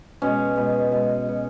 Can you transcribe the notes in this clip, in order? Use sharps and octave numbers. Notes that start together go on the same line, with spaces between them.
B2 G#3 C#4
B2 G#3
B2 G#3
B2 G#3